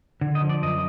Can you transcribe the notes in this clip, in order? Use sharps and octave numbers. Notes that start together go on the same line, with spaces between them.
D3
D#5
F3
D5
F#2 D#5